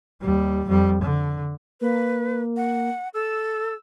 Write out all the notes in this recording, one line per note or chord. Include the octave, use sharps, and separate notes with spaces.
D#2 G3
F2 G3
D3
A#3 B4
F#5
A4 E6